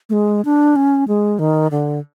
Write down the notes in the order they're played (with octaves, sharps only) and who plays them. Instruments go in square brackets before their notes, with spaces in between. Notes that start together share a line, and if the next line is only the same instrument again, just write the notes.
[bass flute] A3
G#3
D4
C#4
G#3
D#3
D3